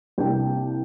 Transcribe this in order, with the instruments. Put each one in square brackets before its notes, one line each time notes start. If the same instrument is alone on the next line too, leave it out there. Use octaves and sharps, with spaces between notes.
[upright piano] C2 C3 A#3 D4 G5